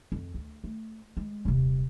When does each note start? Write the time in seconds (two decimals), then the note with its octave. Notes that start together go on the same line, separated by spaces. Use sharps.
0.12 F2
0.34 D2
0.64 A3
1.17 G#3
1.45 D#1 C3